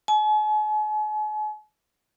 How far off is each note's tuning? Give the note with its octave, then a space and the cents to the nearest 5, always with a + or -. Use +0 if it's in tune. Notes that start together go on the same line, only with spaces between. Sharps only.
G#5 +45